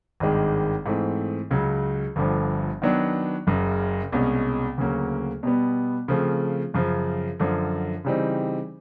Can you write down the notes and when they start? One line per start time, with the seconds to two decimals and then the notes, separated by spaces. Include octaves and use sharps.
0.20 G#1 G2 D#3 G#3
0.86 G#2 E3 A3 C4
1.51 C#2 C#3 F#3
2.16 G1 G2 D3 F3
2.82 D#3 F#3 B3 D4
3.47 F#1 F#2 C#3
4.12 C2 B2 G#3 C#4
4.78 D2 C#3 F#3 A#3 C#4
5.43 B2 G3 B3
6.08 C#3 F3 A3 C4
6.74 F#2 C#3 F3
7.39 F#2 D3 F3
8.05 C#3 E3 G3 C4 D#4